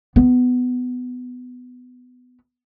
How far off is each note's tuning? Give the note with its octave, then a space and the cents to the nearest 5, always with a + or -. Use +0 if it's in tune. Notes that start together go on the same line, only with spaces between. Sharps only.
B3 +15